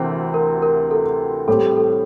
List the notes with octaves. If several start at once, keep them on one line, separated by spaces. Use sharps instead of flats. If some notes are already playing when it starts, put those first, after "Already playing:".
Already playing: D2 C3 E3 C4 A#4 C5
A#4
A#4
A4
A2 G3 C4 G4 A4
A4